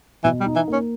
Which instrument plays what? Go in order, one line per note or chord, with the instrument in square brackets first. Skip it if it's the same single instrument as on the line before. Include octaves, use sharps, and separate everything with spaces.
[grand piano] B2 [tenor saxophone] E3
[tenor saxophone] G3
[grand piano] D#4
[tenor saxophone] E3
[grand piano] A#3
[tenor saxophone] C#4